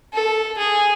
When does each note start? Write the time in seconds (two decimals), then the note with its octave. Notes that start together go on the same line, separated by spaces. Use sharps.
0.14 A4
0.59 G#4